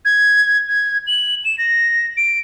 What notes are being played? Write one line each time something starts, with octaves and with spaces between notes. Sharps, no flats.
G#6
G#6
F#7
E7
A#6
D7